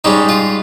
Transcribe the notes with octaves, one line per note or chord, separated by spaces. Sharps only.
G#2 G3 C#4 D#4
F4